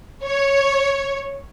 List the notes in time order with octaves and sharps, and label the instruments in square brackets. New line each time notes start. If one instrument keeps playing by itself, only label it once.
[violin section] C#5